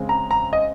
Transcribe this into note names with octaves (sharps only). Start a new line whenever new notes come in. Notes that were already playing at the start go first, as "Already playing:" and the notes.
Already playing: C#3 G#3 C4
A#5
A#5
D#5